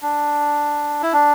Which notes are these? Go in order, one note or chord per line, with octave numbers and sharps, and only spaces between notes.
D4
E4
D4